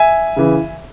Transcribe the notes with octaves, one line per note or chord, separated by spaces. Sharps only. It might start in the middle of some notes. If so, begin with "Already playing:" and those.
Already playing: E5 G#5
C#3 E3